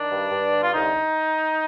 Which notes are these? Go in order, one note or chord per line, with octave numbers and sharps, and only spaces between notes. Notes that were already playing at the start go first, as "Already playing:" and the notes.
Already playing: D#3 D4
G2
G2
D3
F4
C2 D#4